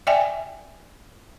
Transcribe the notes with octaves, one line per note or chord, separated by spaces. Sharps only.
D5 E5 G5 G#5